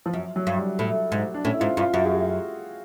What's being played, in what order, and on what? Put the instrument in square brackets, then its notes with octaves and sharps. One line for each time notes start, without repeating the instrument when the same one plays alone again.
[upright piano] F3
[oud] F#2 [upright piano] F#3
[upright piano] F#3
[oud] G2
[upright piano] G3
[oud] A2
G#2
[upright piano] D4
[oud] A2 [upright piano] C#4
[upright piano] E4
[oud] G#2 [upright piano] F4
[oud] G2 [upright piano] F4
[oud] F#2 [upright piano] F#4
[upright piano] G#4
G4